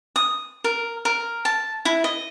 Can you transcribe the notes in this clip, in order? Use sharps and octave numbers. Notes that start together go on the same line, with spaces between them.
D#6
A#4
A#4
A5
E4
D#5